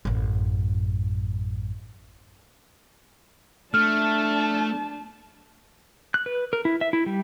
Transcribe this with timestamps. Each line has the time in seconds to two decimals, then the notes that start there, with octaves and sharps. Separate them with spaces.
0.05 A1 F#2
3.74 A3 D4 A5 F6
6.14 F#6
6.26 B4
6.53 A#4
6.65 E4
6.81 E5
6.93 E4
7.06 G3